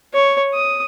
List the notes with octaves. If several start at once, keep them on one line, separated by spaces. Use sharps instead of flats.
C#5
D#6